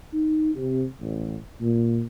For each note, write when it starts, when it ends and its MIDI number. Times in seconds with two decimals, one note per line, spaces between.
0.12 0.50 63
0.55 0.84 48
1.00 1.36 33
1.60 2.01 46